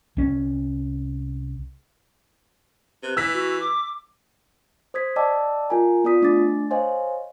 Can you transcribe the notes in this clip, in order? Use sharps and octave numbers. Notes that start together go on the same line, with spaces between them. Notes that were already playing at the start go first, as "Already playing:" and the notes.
C2 C#4
C3 B4
E3 E6 B6
F#4
D6
C5 D#6 G#6 B6
D5 D#5 G5 A5 D6 E6
F4 A#4 G#5 A#5
B3 F4 D5 D#6 B6
A3 D4 D6 A6
C5 C#5 D#5 F5 G#5 C6